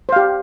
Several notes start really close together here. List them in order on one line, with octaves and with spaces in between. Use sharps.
C5 F5 G4